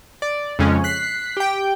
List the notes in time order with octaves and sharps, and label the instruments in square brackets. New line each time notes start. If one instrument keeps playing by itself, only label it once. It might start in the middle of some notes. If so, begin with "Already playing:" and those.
[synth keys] D5
F2 C#3 G#3 C#4
F#6 B6 C7
G4 G5